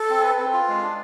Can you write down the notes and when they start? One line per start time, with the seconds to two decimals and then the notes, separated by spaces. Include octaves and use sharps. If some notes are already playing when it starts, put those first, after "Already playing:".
Already playing: A4
0.10 C4
0.23 B4
0.39 C4
0.53 F4
0.68 G#3
0.83 D4